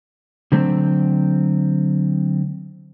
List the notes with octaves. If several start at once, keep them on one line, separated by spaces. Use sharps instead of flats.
D3 F#3 A3 C4